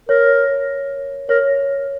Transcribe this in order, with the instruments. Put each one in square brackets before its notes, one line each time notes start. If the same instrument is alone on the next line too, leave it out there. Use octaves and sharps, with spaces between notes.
[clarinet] A#4 [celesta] C#5
[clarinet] A#4 [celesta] C#5